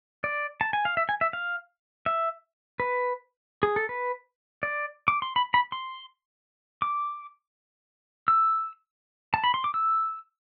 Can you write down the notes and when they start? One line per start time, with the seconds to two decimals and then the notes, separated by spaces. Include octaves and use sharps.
0.24 D5
0.61 A5
0.73 G#5
0.85 F5
0.97 E5
1.09 G#5
1.21 E5
1.33 F5
2.06 E5
2.80 B4
3.63 G#4
3.76 A4
3.89 B4
4.63 D5
5.08 D6
5.22 C6
5.36 B5
5.54 B5
5.72 C6
6.82 D6
8.28 E6
9.34 A5
9.44 B5
9.54 C6
9.64 D6
9.74 E6